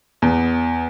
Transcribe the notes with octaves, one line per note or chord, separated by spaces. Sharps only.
E2